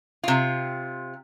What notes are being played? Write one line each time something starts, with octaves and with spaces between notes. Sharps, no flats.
C3 F4